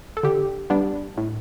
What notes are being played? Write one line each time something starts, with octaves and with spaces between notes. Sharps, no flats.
A4
D3 G4
G3 B3 D4
A2